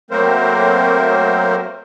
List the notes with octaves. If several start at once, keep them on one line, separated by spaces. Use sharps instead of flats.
F#3 A3 A#3 C4 A#4 C5